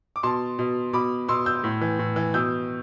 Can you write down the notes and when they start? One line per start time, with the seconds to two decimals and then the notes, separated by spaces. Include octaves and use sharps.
0.16 D6
0.23 B2 A5 C6
0.59 B2
0.93 B2 B5 D6
1.28 B2 C6 E6
1.46 E6 G6
1.64 A2
1.81 E3
1.99 A2
2.16 E3
2.34 B2 E6 G6